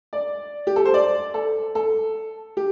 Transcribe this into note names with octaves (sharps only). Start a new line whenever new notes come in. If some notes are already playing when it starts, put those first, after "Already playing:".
D5
G4
A4
C5
D5
A4
A4
G4